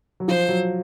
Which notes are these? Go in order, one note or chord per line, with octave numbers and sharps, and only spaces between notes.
F#3
F3 C5
F#3